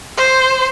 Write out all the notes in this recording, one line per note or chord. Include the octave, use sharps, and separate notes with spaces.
C5